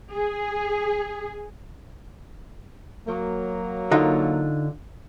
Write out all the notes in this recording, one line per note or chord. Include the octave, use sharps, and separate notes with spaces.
G#4
F#3 A#3
D3 D#4 F4